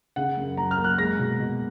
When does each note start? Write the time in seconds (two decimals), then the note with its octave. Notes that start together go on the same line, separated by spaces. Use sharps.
0.16 C#3 F#5
0.37 F#2
0.57 F#3 A#5
0.71 F6
0.78 A#3
0.84 F#6
0.98 G#3 A#6
1.19 B2
1.40 B2